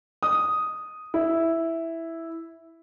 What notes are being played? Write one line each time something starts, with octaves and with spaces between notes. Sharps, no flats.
D#6
E4